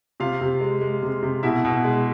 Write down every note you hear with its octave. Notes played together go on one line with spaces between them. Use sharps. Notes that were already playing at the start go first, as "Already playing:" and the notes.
C3 F4 F5
C3
G#3
G#3
C3
C3
B2 E4 E5
B2
G#3